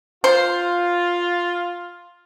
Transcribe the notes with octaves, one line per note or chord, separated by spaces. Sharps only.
F4 C5